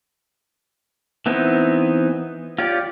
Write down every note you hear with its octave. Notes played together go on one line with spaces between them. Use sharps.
E3 B3 C4 D#4 E4
F4 G4 C#5 D5